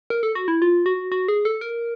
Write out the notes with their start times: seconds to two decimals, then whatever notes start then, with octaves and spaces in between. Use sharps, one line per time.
0.10 A#4
0.23 A4
0.35 F#4
0.48 E4
0.62 F4
0.86 F#4
1.12 F#4
1.28 G#4
1.45 A4
1.61 A#4